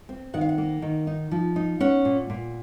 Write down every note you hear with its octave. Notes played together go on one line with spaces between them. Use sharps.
C4
D#3 F#5
F5
F#5
A#3
D#3
D#4
F3
D#4
C#4 F#5
A#2
A#2